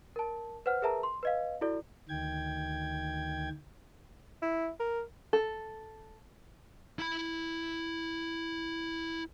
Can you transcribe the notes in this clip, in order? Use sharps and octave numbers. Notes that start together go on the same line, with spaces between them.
A#4 A5
B4 C5 F#5 F6
G#4 A#4 B4 E5 A5 A#5
C6
B4 D#5 F5
E4 F#4 A4 D5
D2 D#3 G5 G#6
E4
A#4
A4
E4 B5